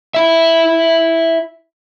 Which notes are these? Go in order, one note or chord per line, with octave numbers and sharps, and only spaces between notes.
E4 E5